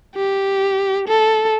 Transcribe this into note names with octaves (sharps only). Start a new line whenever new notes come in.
G4
A4